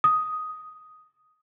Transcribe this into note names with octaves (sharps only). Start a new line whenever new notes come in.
D#6